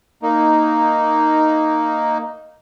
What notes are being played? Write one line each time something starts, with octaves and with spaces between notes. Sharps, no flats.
A#3 D#4